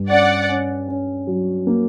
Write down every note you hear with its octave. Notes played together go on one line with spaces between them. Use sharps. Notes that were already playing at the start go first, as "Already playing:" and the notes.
Already playing: G2
C#4 D5 F#5
C#4
C#4
F#3
A#3